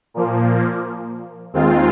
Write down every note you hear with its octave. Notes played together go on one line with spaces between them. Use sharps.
A#2 F3 A#3
D#2 D#3 G#3 C4 F4